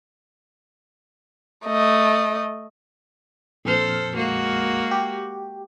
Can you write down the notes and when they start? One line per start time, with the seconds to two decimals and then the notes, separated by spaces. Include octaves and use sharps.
1.66 A3 D#5
3.65 A#1 F2 A4 C5 F6
4.16 G#3 A#3 F#4
4.91 G4